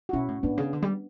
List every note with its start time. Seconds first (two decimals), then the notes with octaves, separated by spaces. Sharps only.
0.09 F#4
0.13 B2 C#4 E4
0.28 A2
0.43 A2 B3 D4
0.58 C#3
0.73 D3
0.82 G3